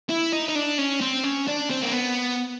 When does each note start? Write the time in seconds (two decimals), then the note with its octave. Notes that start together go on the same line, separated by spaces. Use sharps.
0.09 E4
0.33 D#4
0.48 D#4
0.55 D4
0.78 C#4
1.01 C4
1.24 C#4
1.47 D4
1.70 C4
1.82 A#3
1.93 B3